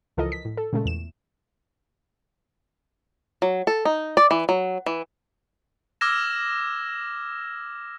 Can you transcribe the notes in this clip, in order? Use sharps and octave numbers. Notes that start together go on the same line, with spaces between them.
C#2 E3 F3 A4 A#4 D#5
B6
A2
A4
A#2 C#3 G#3 A3
E2 E7
F#3
A4
D#4
D5
E3
F#3
E3
D6 E6 F6 G#6 A#6 E7